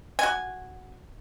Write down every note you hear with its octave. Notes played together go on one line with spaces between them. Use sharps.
F#4 G#5